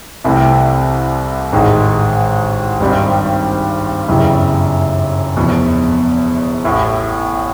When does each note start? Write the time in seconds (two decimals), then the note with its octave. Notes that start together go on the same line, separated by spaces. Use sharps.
0.24 C2 C3 E3 A3 C4
1.53 A1 G#2 D#3 G#3
2.80 G#1 G2 D#3 G3 C4
4.08 G1 F#2 C#3 E3 G3
5.36 F1 E2 B2
6.64 A1 A2 E3